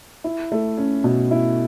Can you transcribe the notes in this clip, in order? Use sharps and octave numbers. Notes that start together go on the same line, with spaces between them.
E4
A3
C#4
B2
E4